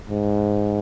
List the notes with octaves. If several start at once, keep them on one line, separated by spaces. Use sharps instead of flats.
G#2